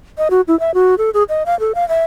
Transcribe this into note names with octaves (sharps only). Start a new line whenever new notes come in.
D#5
F#4
E4
E5
F#4
A4
G#4
D#5
F5
A4
F5
E5